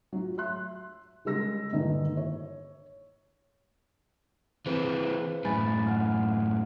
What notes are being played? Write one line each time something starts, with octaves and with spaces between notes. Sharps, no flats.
F#3 F4
E5 C6 F#6
C#3 G3 G#3 E6 A#6
G2 A#2 D3 D#3 D#4 E4
C#5
E3 C4 G#4 B4 C5
F#2 A2 G#5 B5 A6
F#5 F6